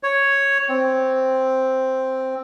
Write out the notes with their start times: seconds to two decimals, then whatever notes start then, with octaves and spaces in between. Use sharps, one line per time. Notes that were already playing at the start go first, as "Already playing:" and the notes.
0.03 C#5
0.69 C4